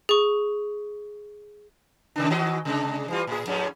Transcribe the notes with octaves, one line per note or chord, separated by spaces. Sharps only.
G#4 C#6
C3 D#3 D4
D#3 F#4 D#5
C3 G#3 D4
E3 G3 F4
A2 G#4
F2 A2 C#4